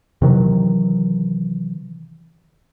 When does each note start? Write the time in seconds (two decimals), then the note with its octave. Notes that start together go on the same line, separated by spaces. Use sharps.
0.22 C3 D#3 E3 F#3